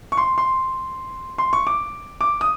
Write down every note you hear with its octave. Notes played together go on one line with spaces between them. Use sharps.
C#6
C6
C6
C6
C#6
D6
D6
D#6